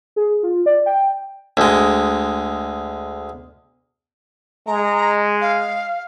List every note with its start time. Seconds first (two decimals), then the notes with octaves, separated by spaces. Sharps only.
0.16 G#4
0.43 F4
0.66 D5
0.86 G5
1.57 D2 G#3
4.67 G#3 A#5
5.41 F5